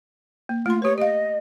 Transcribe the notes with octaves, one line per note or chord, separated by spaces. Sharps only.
A#3
A3 F4 C6
G4 B4 C#5
G4 D#5 F5